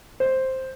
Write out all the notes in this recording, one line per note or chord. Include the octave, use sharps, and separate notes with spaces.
C5